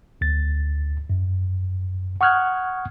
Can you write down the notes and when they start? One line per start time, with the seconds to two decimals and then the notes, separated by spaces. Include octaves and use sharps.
0.21 D2 A6
1.10 F#2
2.21 F#5 C#6 D#6 F6 F#6 G#6